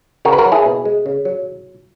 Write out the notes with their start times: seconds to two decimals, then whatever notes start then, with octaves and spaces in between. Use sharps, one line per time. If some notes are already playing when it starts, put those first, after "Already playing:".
0.25 C#3 F#4 A#4
0.33 B4
0.38 F#4 A#4
0.45 F#3
0.52 E4 G#4
0.65 B2
0.85 G#3
1.06 C#3
1.25 F#3